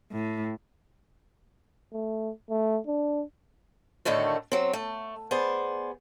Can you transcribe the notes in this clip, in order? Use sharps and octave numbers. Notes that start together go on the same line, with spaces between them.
A2
A3
A3
D4
A2 D3 D#3 A3 F#4
F#3 C4
A3
B3 G#4 C5 D5